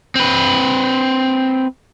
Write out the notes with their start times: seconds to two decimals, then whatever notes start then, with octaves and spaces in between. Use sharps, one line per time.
0.15 C4 B4